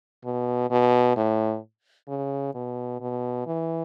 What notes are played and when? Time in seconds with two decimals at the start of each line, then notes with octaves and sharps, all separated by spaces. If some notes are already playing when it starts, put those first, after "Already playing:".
0.25 B2
0.70 B2
1.16 A2
2.08 C#3
2.54 B2
3.00 B2
3.46 E3